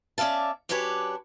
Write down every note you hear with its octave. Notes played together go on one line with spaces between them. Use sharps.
C#4 D5 E5 F5 A5
F#2 D4 G4 B4 C#5 G#5